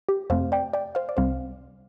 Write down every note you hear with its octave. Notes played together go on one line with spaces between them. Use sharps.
G4
F2 C3 A3 C4 C5 F5
D5 G5
D5 G5
C5 F5
D5
C2 C3 G3 C4 C5 F5